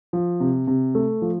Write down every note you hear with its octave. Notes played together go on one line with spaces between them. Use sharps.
F3
C3
C3
A3
F3